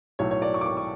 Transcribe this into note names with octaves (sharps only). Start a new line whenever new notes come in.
B1 A2 F#3 C#5
C#5
D5
C#6
D6
C#6
C#6